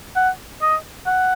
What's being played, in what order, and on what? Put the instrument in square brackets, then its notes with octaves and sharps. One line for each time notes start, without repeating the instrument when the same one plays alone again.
[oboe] F#5
D#5
F#5